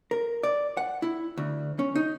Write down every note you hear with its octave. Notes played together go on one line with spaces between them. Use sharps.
A#4
D5
F#5
E4
D2
C#4
D#4